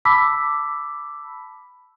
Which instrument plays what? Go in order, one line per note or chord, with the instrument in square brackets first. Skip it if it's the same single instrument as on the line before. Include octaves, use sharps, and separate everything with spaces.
[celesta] A5 B5 D6 E6 B6